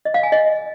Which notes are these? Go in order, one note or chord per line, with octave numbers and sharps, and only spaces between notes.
D#5
F5
G#5
D#5